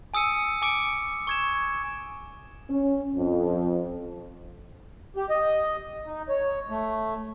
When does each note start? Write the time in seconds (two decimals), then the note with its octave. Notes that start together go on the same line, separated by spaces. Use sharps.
0.14 G#5 D#6 E6 C#7 D#7
0.62 G#5 D6 C#7 D7
1.27 C#6 G#6 E7
2.70 C#4
3.16 F2
5.16 G4
5.30 D#5
6.07 D#4
6.29 C#5
6.70 A3